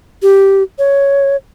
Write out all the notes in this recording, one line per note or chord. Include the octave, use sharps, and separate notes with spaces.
G4
C#5